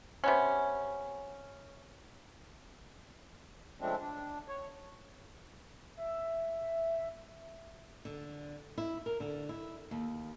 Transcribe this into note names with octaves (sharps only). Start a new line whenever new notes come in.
C3 B3 C#4
C#3 F3 G#3 A3 C4 D4
D4
C#5
E5
D3
E4
A#4
D3
E4
D#2